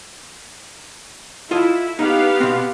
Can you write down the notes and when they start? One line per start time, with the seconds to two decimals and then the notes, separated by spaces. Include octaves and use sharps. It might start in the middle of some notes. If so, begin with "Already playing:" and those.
1.51 E4 F4 A4 D#5
1.99 B3 D#4 G4 F5
2.40 B2 C4